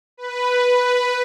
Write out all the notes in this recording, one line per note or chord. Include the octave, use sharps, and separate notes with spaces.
B4